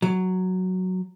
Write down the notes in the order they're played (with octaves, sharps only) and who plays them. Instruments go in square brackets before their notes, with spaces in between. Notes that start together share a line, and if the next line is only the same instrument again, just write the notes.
[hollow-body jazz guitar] F#3